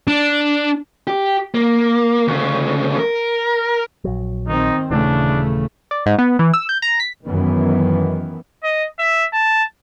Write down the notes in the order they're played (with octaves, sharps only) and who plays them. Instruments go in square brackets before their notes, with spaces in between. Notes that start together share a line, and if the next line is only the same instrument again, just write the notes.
[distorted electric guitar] D4
[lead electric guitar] G4
A#3
D2 C#3
A#4
[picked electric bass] A#1 F#3
[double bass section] D#3 C4 [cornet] D#4
[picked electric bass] D#1 E3 [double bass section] C#3 A3 [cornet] D4
[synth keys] D5
G#2
B3
E3
E6
G6
A#5
B6
[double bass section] F#2 D#3 E3 B3
[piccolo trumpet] D#5
E5
A5